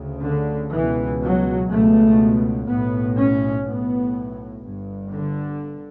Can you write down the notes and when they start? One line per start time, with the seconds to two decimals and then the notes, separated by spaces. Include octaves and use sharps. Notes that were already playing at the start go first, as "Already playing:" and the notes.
Already playing: D2 C#3
0.23 D3
0.72 C#2 B2 E3
1.21 F#3
1.70 C#2 B2 A3
2.69 B1 A2 B3
3.17 C#4
3.66 B1 A2 B3
4.65 G1 G2
5.14 D3